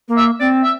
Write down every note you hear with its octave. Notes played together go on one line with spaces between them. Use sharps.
A#3
E5
C4 D5
E5